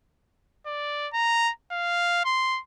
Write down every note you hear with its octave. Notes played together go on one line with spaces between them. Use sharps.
D5
A#5
F5
C6